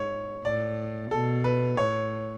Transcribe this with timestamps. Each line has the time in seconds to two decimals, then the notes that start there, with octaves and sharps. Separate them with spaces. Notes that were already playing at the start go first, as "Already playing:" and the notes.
Already playing: G#2 C#5
0.45 A2 D5
1.11 B2 A4
1.44 B4
1.77 A2 C#5